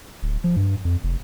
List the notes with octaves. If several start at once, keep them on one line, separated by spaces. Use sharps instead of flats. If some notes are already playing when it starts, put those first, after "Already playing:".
D1
F3
G2
F2
F1